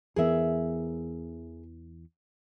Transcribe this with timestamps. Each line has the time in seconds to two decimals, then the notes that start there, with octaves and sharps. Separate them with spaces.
0.16 E2 E3 B3 G#4 A#4 E5